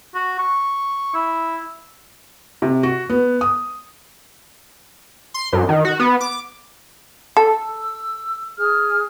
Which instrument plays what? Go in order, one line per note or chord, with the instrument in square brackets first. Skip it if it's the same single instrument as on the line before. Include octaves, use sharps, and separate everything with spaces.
[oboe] F#4
C#6
E4
[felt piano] C3
F#4
B3
D#6
[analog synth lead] C6
F#2
D#3
F#4
B3
D6
[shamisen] A4 [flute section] E6
[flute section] G#4 F6